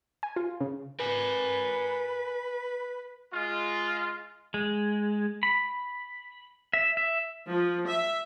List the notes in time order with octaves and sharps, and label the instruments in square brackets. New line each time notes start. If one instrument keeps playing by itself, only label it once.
[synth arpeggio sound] G#5
F4
C#3
[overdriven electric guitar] A#4 G#5 [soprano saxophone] B4
[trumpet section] G#3 F4
[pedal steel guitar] G#3
B5
E5
E5
[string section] F3
E5